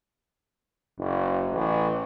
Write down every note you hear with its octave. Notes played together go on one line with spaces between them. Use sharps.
F#1
A1